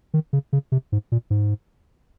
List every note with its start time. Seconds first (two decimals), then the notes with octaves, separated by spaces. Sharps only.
0.14 D#3
0.33 C#3
0.53 C#3
0.72 C3
0.92 G#2
1.12 A#2
1.30 G#2